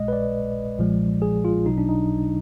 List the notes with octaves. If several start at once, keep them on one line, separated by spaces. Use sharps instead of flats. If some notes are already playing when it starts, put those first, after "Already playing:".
Already playing: A#1 A#2 G#3 D#5
B4
D5
B1 A#2 F3 G#3
G#4
F4
B1 B2 F#3 D#4
D4
D#4